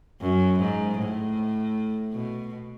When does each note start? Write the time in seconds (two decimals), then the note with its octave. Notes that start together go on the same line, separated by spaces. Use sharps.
0.21 F#2
0.59 G#2
0.98 A2
2.13 B2